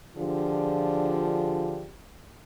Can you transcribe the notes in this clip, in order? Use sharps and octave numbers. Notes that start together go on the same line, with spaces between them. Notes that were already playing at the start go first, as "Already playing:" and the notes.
D3 F3 D4 F4 G4 G#4